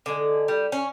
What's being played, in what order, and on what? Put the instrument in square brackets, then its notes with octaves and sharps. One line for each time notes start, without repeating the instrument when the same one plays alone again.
[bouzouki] D3 G#3
G3
C#4